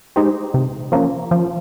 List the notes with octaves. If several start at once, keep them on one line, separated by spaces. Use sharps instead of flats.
G#3 D#4 G4 C5
C3
F3 A#3 C#4
F3